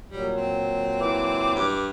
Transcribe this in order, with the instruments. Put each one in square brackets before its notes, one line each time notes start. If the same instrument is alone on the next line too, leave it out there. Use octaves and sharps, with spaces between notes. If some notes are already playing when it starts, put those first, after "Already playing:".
[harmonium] A#2 F#3 [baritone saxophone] G3
[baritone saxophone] C4
[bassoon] E3 [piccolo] D6
[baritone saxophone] G2